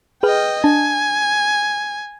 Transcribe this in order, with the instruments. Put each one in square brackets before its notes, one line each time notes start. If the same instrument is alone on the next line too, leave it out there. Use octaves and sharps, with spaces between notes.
[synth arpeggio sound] G#4 B4 F6 [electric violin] D#5 G5
[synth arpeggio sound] D4 A5 [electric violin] G#5